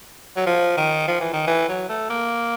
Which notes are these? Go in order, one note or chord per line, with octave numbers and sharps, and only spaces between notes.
F#3
F3
D#3
F3
E3
D#3
E3
F#3
A3
A#3